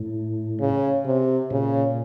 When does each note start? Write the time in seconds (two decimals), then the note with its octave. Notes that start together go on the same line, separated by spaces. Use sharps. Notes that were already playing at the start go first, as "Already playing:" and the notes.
Already playing: A2
0.60 C#3
1.05 C3
1.51 A#2 C#3